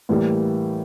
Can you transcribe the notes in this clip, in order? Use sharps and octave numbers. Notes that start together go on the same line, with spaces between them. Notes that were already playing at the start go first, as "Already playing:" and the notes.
A2 E3 G3 A#3